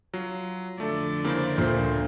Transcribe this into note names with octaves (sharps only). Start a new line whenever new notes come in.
F#3 F4
F2 D3 A3 A4 D5
C#3 A#3 E4 C5
D2 A#2 F4 C5